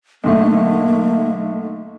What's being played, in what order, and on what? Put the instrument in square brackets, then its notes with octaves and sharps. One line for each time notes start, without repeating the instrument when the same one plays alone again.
[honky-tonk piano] B1 D3 A3 [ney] A#3